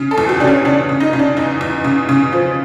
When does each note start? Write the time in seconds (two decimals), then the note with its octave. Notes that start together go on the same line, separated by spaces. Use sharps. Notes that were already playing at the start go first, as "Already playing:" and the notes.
Already playing: C#3
0.11 A4
0.18 E2
0.29 G4
0.40 C#3 D4
0.47 C#4
0.65 C#3 D4
0.89 C#3
1.00 D#4
1.13 C#3
1.19 D4
1.37 E2 D#4
1.61 E2
1.84 C#3
2.09 C#3
2.33 F3